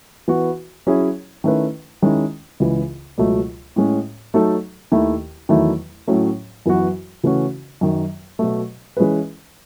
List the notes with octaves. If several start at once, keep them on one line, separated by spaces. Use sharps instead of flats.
E3 B3 F#4
F#3 C#4 E4 G#4 C#5
D#3 A3 C#4 E4 B4
D#3 G#3 C#4 E4
C#2 C#3 E3
C#2 B2 F#3 A3
A2 G#3 C#4
F#3 A3 D#4 A4
D#2 D#3 A3 E4
E2 D#3 F#3 A3 E4
A2 F#3 A3 C#4
F#2 E3 B3 F#4
C#3 E3 A3 C#4 F#4
F#2 D#3 F#3
B2 F#3 A3
E3 G#3 C#4 G#4 B4